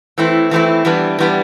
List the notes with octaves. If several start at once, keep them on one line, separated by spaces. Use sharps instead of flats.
E3 A3 C4 E4
E3 A3 C4 E4
E3 G3 B3 D4
E3 G3 B3 D4